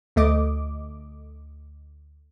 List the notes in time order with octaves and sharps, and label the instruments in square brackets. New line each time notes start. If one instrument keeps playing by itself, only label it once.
[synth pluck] D2 A3 D#5 D6